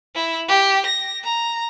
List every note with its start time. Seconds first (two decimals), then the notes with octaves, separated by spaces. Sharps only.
0.15 E4
0.48 G4
0.86 A#6
1.24 A#5